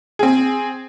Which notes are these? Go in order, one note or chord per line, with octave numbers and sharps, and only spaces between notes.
C4 G#4